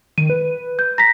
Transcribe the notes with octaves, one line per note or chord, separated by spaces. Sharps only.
D#3 D#7
B4
G6
A#5 A#6 B6